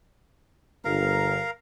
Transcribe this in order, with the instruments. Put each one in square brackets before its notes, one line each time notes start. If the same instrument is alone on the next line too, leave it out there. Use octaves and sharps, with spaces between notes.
[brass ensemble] G1 [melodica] A#4 F5 A#5